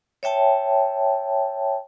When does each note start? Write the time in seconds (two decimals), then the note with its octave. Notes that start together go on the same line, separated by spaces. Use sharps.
0.23 C#5 E5 G5 A5